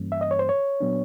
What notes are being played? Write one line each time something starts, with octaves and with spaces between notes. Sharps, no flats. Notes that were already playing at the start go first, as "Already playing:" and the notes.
Already playing: G2 E3 G3 A#3 C#4
E5
D#5
C#5
C5
C#5
A#2 F#3 B3 D4